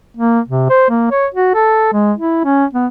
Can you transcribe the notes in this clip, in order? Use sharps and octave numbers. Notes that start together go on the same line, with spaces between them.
A#3
C3
C5
A#3
C#5
F#4
A4
G#3
E4
C#4
B3